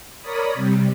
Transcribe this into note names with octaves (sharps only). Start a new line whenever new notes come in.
A#4 C#5 D5 B5 D#6
C3 G3